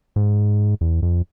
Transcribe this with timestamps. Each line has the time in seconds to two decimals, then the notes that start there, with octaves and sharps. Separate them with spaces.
0.16 G#2
0.81 E2
1.02 F2